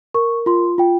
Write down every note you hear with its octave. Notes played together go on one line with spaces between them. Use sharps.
A#4 C#6
F4 C6
F4 G5